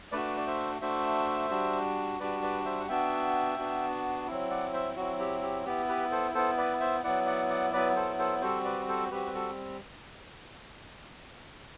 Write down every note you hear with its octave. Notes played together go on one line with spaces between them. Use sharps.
A3 D4 F#4 B4 D5
D5
C5 E5
A3 D4 F#4 C5 E5
G3 D4 F#4
G3 D4 F#4 B4 D5
B4 D5
C5 E5
F#5
B3 D4 F#4 E5 G5
B3 D4 F#4
F#3 C4 E4
D5 F#5
C5 E5
F#3 C4 E4 F#4
G4
G4
B3 E4 G4
G4 B4
A4 C5
B3 E4 A4 C5
B4 D5
C5 E5
F#3 B3 E4 D5 F#5
D5 F#5
D5 F#5
F#3 B3 E4 B4 D5
A4 C5
A4 C5
G3 C4 F#4 A4 C5
B4 D5
A4 C5
G3 C4 F#4 G4 B4
B4
F#4 A4